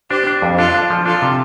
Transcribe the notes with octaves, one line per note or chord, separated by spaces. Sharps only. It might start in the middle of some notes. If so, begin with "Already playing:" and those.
D4 G4 C5
D4
F2
D4 F4 A4
D4
F3
D4 F4 A4
C3